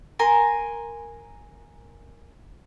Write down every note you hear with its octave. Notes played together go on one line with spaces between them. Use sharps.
A#4 G#5 C6